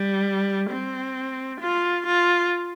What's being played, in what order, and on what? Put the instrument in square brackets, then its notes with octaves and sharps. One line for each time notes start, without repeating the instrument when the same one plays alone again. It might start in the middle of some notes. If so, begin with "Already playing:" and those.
Already playing: [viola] G3
C4
F4
F4